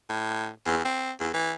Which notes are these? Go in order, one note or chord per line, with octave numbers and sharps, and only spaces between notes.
A2
E2
C4
E2
E3